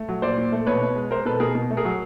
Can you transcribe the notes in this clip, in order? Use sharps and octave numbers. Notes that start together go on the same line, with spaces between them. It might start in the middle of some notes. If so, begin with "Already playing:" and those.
Already playing: A3
F#3
A#2 C5 D5
A#2
A3
B2 B4 C#5
B2
G#3
G#3 A#4 C5
B2 A4 B4
B2 G#4 A#4
B2
A3
G#4 A#4
F#3